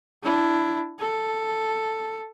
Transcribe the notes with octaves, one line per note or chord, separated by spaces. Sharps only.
D4 E4
A4